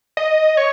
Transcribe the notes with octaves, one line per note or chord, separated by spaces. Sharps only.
D#5
C#5